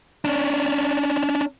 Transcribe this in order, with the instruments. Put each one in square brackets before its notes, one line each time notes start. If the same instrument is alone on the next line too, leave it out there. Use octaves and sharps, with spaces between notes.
[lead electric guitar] C#4 D4